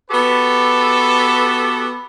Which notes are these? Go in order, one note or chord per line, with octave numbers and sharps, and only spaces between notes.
B3 F#4 G4 A4 B4